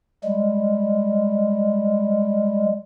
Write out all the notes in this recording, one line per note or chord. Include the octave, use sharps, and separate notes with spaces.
G3 G#3